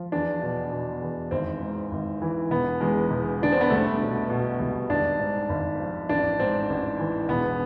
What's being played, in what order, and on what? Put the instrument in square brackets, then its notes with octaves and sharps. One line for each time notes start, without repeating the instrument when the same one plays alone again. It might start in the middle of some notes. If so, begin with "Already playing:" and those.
Already playing: [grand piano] F3
E2 D4
B2
B2
E2
G#1 C4
G#2
G#1
E3
E1 B3
E2 G#3
E1
D3 D4
C4
B3
C2 A3
B2
B2
C2
G#1 D4
G#2
G#1
F3
A1 D4
G#2 C4
A1
E3
E1 B3